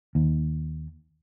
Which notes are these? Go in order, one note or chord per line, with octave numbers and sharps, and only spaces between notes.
D#2